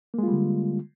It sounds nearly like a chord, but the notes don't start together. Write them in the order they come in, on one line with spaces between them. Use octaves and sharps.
A#3 G#3 F4 G3 D3